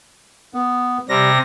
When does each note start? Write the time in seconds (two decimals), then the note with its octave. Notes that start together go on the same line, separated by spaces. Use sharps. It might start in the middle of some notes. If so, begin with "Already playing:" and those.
0.54 B3
1.08 C3 G3 A#6